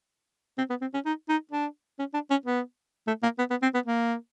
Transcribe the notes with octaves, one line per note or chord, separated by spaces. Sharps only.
C4
B3
C4
C#4
D#4
D#4
D4
C#4
D4
C#4
B3
A3
A#3
B3
B3
C4
B3
A#3